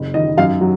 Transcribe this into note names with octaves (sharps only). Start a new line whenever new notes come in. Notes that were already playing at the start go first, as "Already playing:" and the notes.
Already playing: F#1
D#3 D#5
F#2 F5
F#3